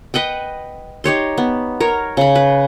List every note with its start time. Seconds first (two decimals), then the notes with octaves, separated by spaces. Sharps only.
0.14 B4 D#5 F#5 G5
1.04 D#4 G4 C#5 C6
1.38 B3
1.80 A#4 C#5
2.17 C#3 B5
2.35 B4